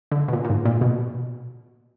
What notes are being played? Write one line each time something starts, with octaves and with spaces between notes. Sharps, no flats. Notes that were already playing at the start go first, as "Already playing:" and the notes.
D3
B2
A#2
A#2
G#2
A#2
B2